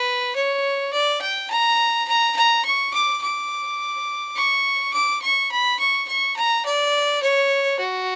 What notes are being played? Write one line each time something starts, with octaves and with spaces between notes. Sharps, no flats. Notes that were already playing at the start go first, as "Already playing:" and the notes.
Already playing: B4
C#5
D5
G5
A#5
A#5
A#5
C#6
D6
D6
C#6
D6
C#6
B5
C#6
C#6
A#5
D5
C#5
F#4